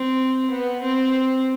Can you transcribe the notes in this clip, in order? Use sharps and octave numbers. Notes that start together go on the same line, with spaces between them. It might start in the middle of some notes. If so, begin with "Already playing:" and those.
Already playing: C4
B3
C4